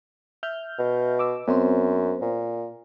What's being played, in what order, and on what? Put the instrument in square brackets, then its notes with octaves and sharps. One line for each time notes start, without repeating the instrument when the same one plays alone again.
[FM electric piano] E5 F6 G6
[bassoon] B2
[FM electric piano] D6 E6
[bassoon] F#2 [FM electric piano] B3 C4 C5
[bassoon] A#2